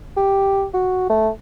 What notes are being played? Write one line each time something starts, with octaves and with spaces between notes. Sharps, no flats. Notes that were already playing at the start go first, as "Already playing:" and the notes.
G4
F#4
A3